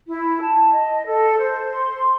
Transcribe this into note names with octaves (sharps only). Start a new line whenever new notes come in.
E4
A5
D#5
A4
C5
C6